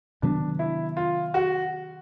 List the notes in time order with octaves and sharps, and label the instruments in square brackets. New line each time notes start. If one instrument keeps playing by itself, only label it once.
[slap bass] C3 D#3 F#3 B3 [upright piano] D4
[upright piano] E4
F4
F#4